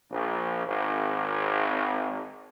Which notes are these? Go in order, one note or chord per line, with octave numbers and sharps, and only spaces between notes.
A#1
G#1